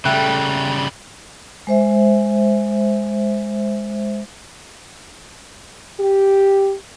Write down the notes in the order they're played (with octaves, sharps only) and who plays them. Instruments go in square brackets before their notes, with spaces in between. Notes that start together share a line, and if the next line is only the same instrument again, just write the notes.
[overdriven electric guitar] C#3 G3 [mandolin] A3 G4 F#5
[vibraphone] G#3 C5 E5
[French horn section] G4